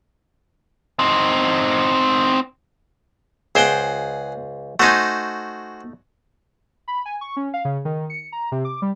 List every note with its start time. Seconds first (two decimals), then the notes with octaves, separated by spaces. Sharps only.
0.99 C4 D#4
3.55 C#2 G#4 C5 F#5 G5
4.79 A3 D#4 F#4 C5 G#5
6.88 B5
7.05 G#5
7.21 C#6
7.37 C#4
7.54 F5
7.65 C#3
7.85 D#3
8.10 C#7
8.32 A#5
8.52 C3
8.65 D6
8.82 G3